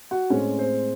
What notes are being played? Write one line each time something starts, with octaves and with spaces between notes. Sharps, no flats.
F#4 F#5
A2 G#3 C4 C#4 C#5
C4 C5